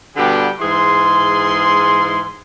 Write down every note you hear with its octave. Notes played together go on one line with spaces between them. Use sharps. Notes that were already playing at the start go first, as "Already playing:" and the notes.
B2 D3 G3 B3 G4 G5
G#2 E3 G#4 C6